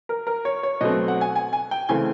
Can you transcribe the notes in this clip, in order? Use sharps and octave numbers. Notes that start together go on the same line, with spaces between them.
A#4
A#4
C#5
C#5
B2 F#3 A3 C4 D#5
F#5
G#5
G#5
G#5
G5
C#3 E3 A3 C4 G#5